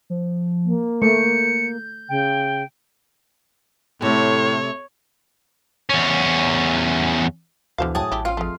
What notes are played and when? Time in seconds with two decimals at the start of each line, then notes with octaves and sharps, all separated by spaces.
0.10 F3
0.65 A#3
1.02 A3 G6 C#7
2.09 C#3 G5
4.02 A2 C3 A3 C#5
5.89 E2 C#4
7.78 D2 B2 D3 E3 C5 F5 F6
7.95 A2 F#3 G#4 G5 A5 D#6
8.12 A1 E4 G4
8.25 C4 C#4 F4 F5
8.37 F2 G#3 A3